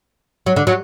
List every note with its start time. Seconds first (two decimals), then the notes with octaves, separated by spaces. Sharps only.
0.46 F#3
0.56 D3
0.67 F#3